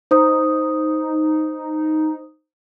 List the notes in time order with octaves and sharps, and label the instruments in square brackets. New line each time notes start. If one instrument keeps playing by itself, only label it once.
[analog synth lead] D#4 [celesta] C5 D#6